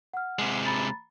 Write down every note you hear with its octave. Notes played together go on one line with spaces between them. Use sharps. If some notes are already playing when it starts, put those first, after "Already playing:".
F#5 F6
C3 G#3
A#5 B5 A6